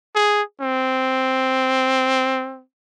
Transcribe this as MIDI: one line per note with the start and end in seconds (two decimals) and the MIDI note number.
0.15 0.42 68
0.61 2.62 60